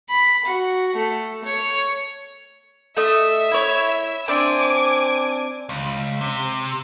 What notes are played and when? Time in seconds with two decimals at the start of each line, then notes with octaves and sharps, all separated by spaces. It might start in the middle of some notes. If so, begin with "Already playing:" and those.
0.10 B5
0.46 F#4
0.96 A3
1.45 C#5
2.97 A3 D#5 E5
3.51 E4 C#5
4.28 C4 D4 G#5 D6
5.69 C#2
6.21 C3